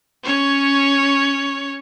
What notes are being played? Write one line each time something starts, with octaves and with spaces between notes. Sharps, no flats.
C#4 C#5